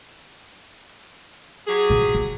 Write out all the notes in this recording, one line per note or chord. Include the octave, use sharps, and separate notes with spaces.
F#3 G4 G#4
A#2 F3
A#3